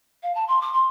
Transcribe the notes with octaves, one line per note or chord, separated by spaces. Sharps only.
F5
A5
C6
D6
C6